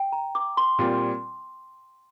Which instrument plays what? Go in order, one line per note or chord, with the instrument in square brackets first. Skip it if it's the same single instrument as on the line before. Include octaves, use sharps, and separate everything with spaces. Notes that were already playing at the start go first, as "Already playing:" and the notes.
Already playing: [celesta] G5
A#5
D6
C6
[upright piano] A#2 G3 C4 F4